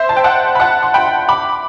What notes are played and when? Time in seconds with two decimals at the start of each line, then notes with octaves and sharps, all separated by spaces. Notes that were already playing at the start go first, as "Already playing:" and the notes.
Already playing: C5 E5
0.09 A5
0.16 G5
0.24 F#5 A5
0.55 B5
0.60 F#5 A5
0.83 C6
0.94 G5 B5
1.29 B5 D6